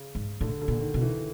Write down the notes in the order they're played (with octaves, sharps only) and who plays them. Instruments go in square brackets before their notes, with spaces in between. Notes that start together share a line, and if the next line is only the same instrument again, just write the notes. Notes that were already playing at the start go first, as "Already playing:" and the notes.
Already playing: [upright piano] C#3
[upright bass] G#2
[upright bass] A2 [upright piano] D3
[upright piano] D3
[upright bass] A#2
[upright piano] D#3
[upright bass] B2
[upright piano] E3